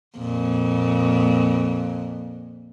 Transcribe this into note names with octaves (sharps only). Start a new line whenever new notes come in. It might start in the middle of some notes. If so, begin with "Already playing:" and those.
F2 A#2